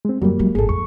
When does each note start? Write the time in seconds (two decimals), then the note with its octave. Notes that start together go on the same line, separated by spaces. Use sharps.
0.05 G#3 C4
0.21 F#2 D#3 F#3 G3 A#3
0.39 G#3 A3
0.55 G#1 A#2 G#4 A4
0.69 F2 C#6